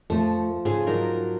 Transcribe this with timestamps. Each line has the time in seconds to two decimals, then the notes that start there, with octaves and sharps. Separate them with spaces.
0.10 F2 F3 A3 A4
0.65 G#2 C#3 A3 F4 G#4
0.87 F#3 D#4 A#4 D5